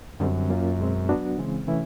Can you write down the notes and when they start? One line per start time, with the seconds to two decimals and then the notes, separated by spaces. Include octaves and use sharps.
0.20 F#2 D3 G3 C4
0.49 F#3 A#3 C#4 F4
0.78 B2 G#3 C4
1.09 F#3 B3 D4 F#4
1.38 C#3 E3 G#3 C4
1.68 C3 E3 A3 C#4 E4